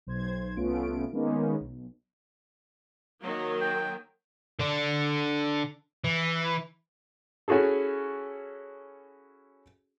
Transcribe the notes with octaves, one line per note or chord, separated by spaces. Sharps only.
B1 C5 G#6
C2 A3 B3 C#4 F4 D7
D#3 G#3 A#3 B3 C#4 D#4
B1
D#3 F#3 A#3
G5
D3 D4
E3
C#4 E4 F#4 G#4 A4